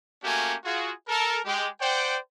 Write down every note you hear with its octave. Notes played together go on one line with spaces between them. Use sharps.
A3 A#3 C#4 F#4 G4 G#5
F4 F#4 G#4
A4 A#4
G#3 G4
C5 D5 F#5 G5